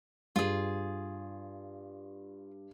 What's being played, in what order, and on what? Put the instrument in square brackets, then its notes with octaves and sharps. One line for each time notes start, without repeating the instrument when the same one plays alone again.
[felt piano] G2 [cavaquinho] F4 G#4